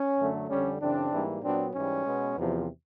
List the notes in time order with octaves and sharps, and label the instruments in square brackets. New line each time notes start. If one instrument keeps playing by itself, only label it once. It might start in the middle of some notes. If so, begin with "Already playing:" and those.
Already playing: [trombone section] C#4
F#2 D3 F#3 A3
F2 D3 G3 C#4
F#2 C#3 E3 C4 D4
G#2 E3 G3 A#3
A#2 F#3 B3 C4 D4
G#2 E3 G3 C#4
B2 G#3 B3
E2 C3 F3